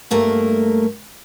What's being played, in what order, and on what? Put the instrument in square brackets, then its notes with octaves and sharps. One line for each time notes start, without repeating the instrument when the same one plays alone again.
[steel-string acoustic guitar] D2 G2 A3 A#3 A#4